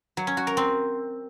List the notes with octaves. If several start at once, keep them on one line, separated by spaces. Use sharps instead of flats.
F#3
C#4
F#4
A#4
C4